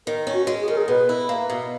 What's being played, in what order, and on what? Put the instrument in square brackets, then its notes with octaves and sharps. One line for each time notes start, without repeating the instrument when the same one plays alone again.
[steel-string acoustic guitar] D#3 [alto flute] A#4
[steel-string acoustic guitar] C#4
[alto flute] F#4
[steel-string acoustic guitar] G#3
[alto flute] G#4
[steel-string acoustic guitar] D#3 [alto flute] A#4
[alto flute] G#4
[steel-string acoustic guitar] B2 [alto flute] B4
[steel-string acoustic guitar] E4
A#3
B2